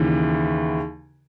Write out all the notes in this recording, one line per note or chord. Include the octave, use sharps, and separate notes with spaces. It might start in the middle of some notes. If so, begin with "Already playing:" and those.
Already playing: D#2 C#3 E3